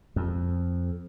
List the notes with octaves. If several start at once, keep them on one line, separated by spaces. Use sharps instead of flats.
F2